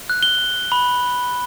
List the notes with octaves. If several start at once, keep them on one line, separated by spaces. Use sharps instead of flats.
F#6
G7
B5